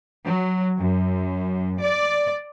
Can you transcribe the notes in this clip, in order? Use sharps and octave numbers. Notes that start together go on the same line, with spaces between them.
F#3
F#2
D5